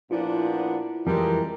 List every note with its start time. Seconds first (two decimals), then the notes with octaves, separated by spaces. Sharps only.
0.11 A#2 F3 B3 D4 E4 F4
1.07 F2 E3 G3 G#3 A#4